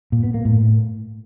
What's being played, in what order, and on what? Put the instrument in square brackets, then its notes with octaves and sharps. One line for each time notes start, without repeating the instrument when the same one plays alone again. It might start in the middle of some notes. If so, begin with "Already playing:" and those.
[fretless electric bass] A#2
B3
A#3
A2